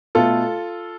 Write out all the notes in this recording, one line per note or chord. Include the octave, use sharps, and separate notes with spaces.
B2 A3 F4 A4